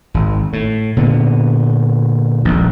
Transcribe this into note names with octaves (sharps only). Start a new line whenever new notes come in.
G#1
A2
A#2 D3 B3
D#1 A#1